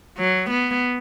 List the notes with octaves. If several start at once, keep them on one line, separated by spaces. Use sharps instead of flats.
F#3
B3